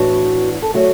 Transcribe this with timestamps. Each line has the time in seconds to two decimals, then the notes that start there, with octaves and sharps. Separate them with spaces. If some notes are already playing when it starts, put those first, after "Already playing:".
Already playing: A2 E3 B3 D4 F#4
0.62 A4
0.74 D3 F#3 A3 F#4